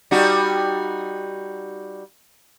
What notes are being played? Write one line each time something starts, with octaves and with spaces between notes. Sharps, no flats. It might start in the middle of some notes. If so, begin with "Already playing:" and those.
G3 D#4 F#4